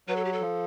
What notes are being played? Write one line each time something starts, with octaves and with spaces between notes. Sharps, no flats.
F#3 B4
A4
G4
A4
F3